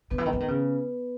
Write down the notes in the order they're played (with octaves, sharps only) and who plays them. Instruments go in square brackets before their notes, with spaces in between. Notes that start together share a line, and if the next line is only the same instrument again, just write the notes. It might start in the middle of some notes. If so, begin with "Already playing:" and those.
[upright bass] D#3 [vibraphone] B3 B4
[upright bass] E3
D#3
E3
D#3
C#3